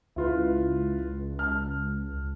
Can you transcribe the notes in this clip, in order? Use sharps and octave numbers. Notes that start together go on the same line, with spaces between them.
C#2 E4 F4 B4
A5 F6